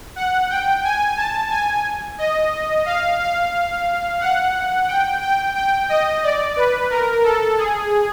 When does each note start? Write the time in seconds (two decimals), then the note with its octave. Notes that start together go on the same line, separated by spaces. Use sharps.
0.16 F#5
0.50 G5
0.84 G#5
1.17 A5
1.51 G#5
2.18 D#5
2.86 F5
3.20 F5
4.21 F#5
4.88 G5
5.22 G5
5.55 G5
5.89 D#5
6.23 D5
6.56 B4
6.90 A#4
7.24 A4
7.58 G#4